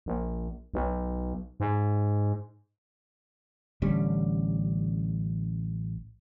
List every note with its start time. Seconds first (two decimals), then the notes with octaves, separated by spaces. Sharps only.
0.06 A#1
0.74 B1
1.60 G#2
3.82 A1 D3 G3 C#4